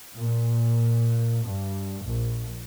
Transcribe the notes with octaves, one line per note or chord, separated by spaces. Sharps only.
A#2
G2
A#1